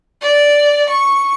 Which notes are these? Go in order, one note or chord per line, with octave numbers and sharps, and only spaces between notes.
D5
C#6